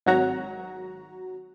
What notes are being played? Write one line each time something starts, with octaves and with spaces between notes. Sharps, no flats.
G#1 F#3 F#4 A#5